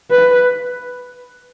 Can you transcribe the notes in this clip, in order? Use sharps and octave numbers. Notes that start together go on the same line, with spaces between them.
B4